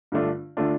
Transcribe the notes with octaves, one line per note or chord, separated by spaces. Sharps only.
G2 D3 A3 D4 F4
D3 A3 D4 F4